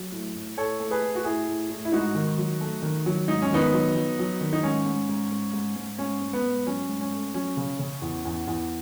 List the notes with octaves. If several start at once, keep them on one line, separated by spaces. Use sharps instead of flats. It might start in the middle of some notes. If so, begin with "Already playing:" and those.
Already playing: F#3
A2
A2
A2 A4 C#5
A3
G#4 B4
A3
F#4
A2 E4 G#4
A2
A2
E4
G#2 D#4 F#4
D#3
F#3
A3
D#3
F#3
G#2 D#4
C#4
D#3 B3 D#4
F#3
F#3
F#3
D#3
D#4
G#2 C#4
G#2
G#2
G#2
G#2
G#2
G#2 C#4
G#2
B3
G#2
F#3 C#4
G#2
C#4
A3
F#3 C#4
C#3
C#3
E2
E2
E2